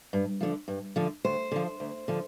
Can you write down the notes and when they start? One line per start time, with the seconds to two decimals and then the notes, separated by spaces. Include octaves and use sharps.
0.13 G2
0.41 D3 F3
0.68 G2
0.96 D3 F3
1.24 D2 C5
1.51 D3 F3
1.80 D2
2.08 D3 F3